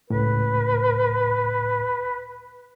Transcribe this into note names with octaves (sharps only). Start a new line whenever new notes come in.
C#2 A2 B4